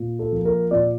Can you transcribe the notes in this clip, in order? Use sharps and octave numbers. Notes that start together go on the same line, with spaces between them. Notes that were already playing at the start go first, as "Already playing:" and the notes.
Already playing: A#2
A4
F3 A#3
A#4
A#2 D5